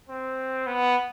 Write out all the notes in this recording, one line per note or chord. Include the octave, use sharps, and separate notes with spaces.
C4
B3